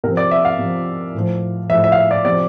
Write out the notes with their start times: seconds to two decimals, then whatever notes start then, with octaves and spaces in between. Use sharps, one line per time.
0.04 C3 F3 A#4
0.17 D5
0.31 E5
0.45 F5
0.58 C3 F3
1.14 A2 F3
1.70 A2 F3 E5
1.84 E5
1.92 F5
1.97 E5
2.11 D5
2.25 C3 F3 D5